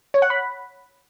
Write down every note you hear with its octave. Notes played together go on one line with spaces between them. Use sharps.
C#5
F#5
B5